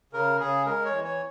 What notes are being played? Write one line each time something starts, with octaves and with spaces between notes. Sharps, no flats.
C#3 A#4
C#3 G#4
G#3 A#4
C#5
E3
C#5